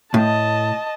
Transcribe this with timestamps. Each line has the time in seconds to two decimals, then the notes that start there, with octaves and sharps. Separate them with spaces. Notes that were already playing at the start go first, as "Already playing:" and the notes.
0.14 A2 D#5 A5